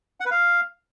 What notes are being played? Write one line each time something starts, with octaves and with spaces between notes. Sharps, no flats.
F#5
B4
F5